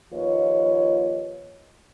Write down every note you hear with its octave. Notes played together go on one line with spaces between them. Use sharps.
D#2 F3 F4 B4 C#5 D#5